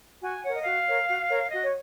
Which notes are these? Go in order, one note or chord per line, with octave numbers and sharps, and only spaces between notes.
F#4 G#5
A#4 C#5 F#5
D#5
F#4 F5
A#4 C#5
F#4
A#4 C#5
F#4 D#5
C#5